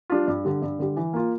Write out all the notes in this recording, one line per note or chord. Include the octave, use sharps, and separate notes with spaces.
G3 D4 F4
G2
D3 G3
G2
D3 G3
E3
A#3 F4